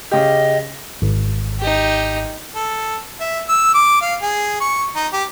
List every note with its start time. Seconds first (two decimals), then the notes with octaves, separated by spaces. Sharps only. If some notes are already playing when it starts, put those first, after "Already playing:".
0.11 C#3 G4 D#5
1.02 G#1
1.59 D#4 G4
2.55 A4
3.20 E5
3.49 E6
3.74 D6
4.02 F5
4.22 G#4
4.61 C#6
4.96 D#4
5.13 G4